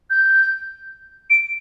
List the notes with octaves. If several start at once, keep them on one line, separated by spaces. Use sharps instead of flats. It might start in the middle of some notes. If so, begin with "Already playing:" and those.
G6
D7